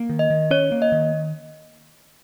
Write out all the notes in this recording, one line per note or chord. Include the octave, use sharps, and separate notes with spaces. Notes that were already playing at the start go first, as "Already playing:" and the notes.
Already playing: A#3
D#3
D#5
D#3
C#4 C#5
A#3
D#5
D#3